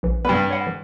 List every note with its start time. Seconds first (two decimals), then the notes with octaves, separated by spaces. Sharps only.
0.03 A#1 E3
0.25 G2 G3 B3 B4
0.51 C#5 F#5 B5
0.67 E3